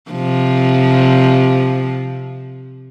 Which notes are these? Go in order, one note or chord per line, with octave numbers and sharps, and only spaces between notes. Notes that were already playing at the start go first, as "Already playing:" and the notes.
C3 F3